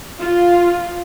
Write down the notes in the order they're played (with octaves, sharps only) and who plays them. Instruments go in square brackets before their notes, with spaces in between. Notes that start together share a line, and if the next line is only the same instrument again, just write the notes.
[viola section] F4